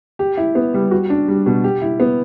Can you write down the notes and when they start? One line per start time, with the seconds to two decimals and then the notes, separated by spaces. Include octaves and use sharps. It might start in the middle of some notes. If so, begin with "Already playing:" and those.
0.19 G4
0.37 E4
0.55 B3
0.74 G3
0.91 F#4
1.10 D4
1.28 G3
1.46 B2
1.64 G4
1.82 E4
2.00 B3